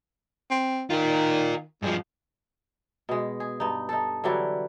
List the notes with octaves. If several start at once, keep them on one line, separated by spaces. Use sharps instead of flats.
C4
D#3 F4 A#4
G2 F3 G#3
B2 G#3
G#4
G2 D#4
D#4 A4
D3 E3 F#3 G3